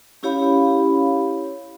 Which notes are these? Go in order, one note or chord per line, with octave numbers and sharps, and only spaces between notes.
C#4 E4 G4 C#5 F5 B5